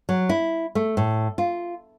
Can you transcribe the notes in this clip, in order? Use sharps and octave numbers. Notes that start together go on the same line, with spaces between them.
F#3
E4
A3
A2
F4